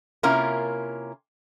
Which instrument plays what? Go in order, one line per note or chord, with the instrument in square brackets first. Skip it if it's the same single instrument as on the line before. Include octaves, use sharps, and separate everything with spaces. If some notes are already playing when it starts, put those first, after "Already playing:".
[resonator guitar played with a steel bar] C3 A#3 C#4 E4 F4 A#4